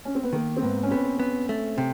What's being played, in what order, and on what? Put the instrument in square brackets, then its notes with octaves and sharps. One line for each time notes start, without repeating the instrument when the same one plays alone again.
[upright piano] C#4
C4
B3
[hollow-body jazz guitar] D#3 [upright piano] A#3
[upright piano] C4
[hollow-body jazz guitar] G#2 [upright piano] B3
[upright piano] C#4
[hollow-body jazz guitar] B3 [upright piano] C4
[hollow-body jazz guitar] B3
A3
C3